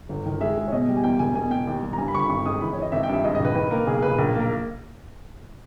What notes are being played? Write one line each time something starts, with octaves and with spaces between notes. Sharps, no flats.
G1
D#3
G#3 E5
G#3
C#5
B2 D#5
G3
G#5
E2 G5
E1 G#5
B2 G#5
B2 G5
D#2
G3
A#5
G2 G#5
B5
G1 C#6
B5
G#1 C#6
G#2 D#6
E3 B5
C#5
E3 D#5
G#1 E5
G5
G2
E5
G#2 D#5
D#5
A#1
B4
D#3 B4
A#3 A#4
B1 G#4
B1 B4
A#1 A#4
A#3
A#4